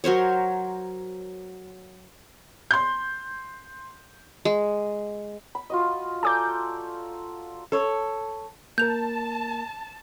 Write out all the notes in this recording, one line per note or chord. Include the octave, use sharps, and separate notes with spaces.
F#3 A#4 C5 C#5
C6 G6
G#3
B5
F4 F#4 D#5
A4 D5 G#5 A#5 D6 G6
A4 C#5
A#3 A#4 A5 G6 F7